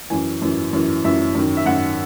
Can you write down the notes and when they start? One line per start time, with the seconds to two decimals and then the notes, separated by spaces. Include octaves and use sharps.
0.10 F#2 E3 G#5
0.42 F#2 E3
0.73 F#2 E3
1.05 F#2 E3 E5
1.35 F#2 D#3
1.57 E5
1.66 F#2 D#3 F#5